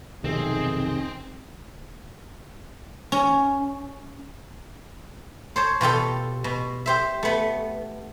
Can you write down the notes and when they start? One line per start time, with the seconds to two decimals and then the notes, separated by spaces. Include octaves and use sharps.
0.24 B1 F2 C3 D#3 C4 D#4 G#4
3.12 C#4
5.56 C5 C#5 A5
5.81 B2 F4 G4 A4
6.44 B2
6.86 G4 C5 E5
7.23 A3 B3